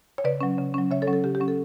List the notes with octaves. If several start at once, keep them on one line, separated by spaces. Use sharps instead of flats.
C#5
C#3 B4 D5
F#3 C#4
C#3
F#3 C#4
C#3 C#5 E5
A4 C#5
F#3 C#4
A4
C#3 G4
G4
F#3 C#4
A4